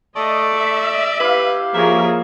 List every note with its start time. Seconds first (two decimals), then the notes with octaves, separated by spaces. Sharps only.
0.16 A3 D5 D#5
0.54 E5
1.20 E4 G4 B4 F5
1.74 F3 A#3 G#4 A#4 C#5 E5